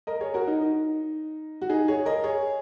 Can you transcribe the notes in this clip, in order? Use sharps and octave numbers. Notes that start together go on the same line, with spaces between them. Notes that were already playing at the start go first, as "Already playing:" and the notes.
A#4 D#5
G#4 C#5
F#4 A#4
D#4
D#4
F#4
D#4 G#4
G#4 C#5
A#4 D#5
G#4 C#5